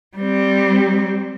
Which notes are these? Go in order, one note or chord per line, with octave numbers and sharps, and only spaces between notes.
G3 C4